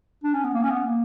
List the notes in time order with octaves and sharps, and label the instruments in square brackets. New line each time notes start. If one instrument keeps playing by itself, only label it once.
[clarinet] D4
C#4
B3
A#3
C#4
B3
A#3